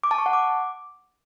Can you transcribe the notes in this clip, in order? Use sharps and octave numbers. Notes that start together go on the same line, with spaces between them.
D6
A5
C#6
F#5
D6